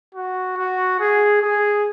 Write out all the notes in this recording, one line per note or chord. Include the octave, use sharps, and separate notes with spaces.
F#4
F#4
G#4
G#4